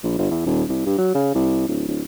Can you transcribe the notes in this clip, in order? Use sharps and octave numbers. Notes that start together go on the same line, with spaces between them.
A#1
G1
E2
D#1
C2
G2
F#3
C#3
C2
D1
D1